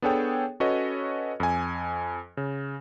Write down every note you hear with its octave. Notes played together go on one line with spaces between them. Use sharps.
B3 D4 G#4 A4 C#5 G5
C#4 F#4 A4 B4 C#5 D#5
F2 G#5
C#3